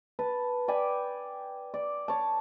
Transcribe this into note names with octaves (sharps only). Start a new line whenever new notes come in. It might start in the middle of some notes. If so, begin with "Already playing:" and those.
B4 A5
D5 G5 G#5 B5
D5
C#5 A5